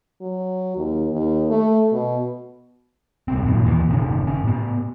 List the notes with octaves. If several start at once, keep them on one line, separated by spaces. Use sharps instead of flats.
F#3
D#2
D#2
A3
B2
D#1 C2 C4
F#2 A#2 D#3
D#2 E3
F#1 C3 D#3 C#4
F#1 C#4
A2 B3